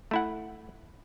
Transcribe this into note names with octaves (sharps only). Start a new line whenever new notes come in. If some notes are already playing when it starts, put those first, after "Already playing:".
A3 E4 F#5